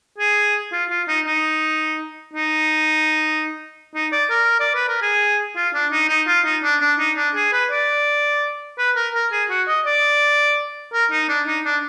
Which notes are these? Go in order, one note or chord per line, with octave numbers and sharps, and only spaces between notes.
G#4
F4
F4
D#4
D#4
D#4
D#4
D5
A#4
D5
B4
A#4
G#4
F4
D4
D#4
D#4
F4
D#4
D4
D4
D#4
D4
G#4
B4
D5
B4
A#4
A#4
G#4
F#4
D#5
D5
A#4
D#4
D4
D#4
D4